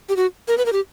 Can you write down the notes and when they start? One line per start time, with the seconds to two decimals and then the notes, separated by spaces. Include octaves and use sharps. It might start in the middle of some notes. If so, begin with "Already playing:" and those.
0.09 G4
0.16 F#4
0.48 A#4
0.58 B4
0.66 A#4
0.73 G4